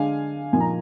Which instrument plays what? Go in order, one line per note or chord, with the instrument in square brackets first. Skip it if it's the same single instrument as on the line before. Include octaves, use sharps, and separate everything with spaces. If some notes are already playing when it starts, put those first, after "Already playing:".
Already playing: [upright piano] D3 G#3 D4 F5 G#5
A#2 F3 A#3 D#4 G#5
A#5